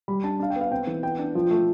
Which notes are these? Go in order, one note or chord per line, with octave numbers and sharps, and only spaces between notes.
G3 B5
D4 A5
D4 F5
G5
B3
F5
C4 G5
E3
B3 G5
D4
F3
A3